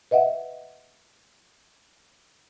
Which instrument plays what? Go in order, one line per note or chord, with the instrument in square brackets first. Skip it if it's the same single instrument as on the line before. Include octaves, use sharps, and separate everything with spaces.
[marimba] B4 D#5 E5 F#5